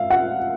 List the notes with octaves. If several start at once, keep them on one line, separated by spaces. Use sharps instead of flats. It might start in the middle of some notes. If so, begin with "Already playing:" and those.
Already playing: E5 F5
F#5